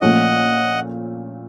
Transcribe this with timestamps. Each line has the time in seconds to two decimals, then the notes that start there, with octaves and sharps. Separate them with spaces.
0.01 A#1 A#2 F3 A3 C#4 D#5 F#5